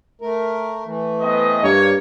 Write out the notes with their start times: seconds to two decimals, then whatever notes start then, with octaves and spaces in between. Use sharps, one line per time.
0.21 A3 A#4
0.86 E3 A3
1.20 B3 C4 D#5
1.63 G2 A#3 C#5